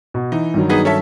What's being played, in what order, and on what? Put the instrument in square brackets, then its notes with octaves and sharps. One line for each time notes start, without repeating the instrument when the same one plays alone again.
[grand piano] B2
[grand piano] E3 [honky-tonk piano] D#4
[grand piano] G2 D#3 F#3
[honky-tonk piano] B3 D#4 G#4
C#4 A4 E5